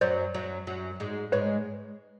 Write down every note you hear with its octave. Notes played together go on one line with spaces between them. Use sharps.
F#2 F#3 C5 D5
F#2 F#3
F#2 F#3
G#2 G#3
G#2 G#3 B4 C#5